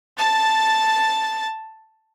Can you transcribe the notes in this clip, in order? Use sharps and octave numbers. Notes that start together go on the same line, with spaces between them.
A5 A6